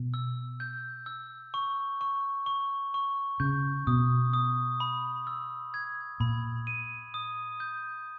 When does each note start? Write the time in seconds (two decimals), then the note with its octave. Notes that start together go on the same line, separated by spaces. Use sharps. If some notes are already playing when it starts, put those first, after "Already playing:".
Already playing: B2
0.14 E6
0.60 G6
1.06 E6
1.54 C#6
2.01 C#6
2.46 C#6
2.94 C#6
3.40 C#3 G6
3.87 B2 D#6
4.34 D#6
4.80 B5
5.27 E6
5.74 G#6
6.20 A#2 B5
6.67 D#7
7.14 D#6
7.60 G6